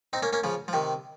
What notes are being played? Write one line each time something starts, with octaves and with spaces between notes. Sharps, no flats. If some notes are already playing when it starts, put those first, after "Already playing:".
C4 D#4
A#3 C#4
A#3 C#4
C#3 F3
F3
C3 D#3